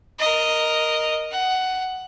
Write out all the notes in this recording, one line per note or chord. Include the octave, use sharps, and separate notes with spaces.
A#4 D#5
F#5